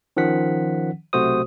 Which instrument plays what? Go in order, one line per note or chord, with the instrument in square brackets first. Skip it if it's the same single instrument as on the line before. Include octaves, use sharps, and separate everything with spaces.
[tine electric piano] D#3 F3 C#4 F#5 B6
B1 C3 A3 F#4 C5 D#6